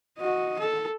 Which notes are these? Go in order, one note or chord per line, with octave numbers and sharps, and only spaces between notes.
F#4 D#5
A4